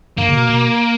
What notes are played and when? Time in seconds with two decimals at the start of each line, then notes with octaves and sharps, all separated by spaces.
0.18 G2 A#3
0.29 C#3
0.33 B2
0.49 B2